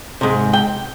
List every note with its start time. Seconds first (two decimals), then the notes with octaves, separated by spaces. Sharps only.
0.21 G#2 C3
0.53 G5